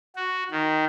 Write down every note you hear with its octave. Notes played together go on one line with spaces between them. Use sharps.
F#4
D#3